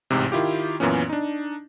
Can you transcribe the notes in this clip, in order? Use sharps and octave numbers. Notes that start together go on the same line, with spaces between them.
A1 G#2 C3
D#3 E4 F4 G4
F#2 A#2 E3 B3 C#4
D4 D#4